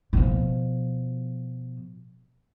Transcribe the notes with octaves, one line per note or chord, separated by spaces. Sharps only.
B2 F3